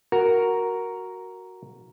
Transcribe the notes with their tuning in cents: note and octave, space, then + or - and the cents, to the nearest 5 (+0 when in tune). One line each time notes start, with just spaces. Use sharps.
F#4 +0 A#4 +0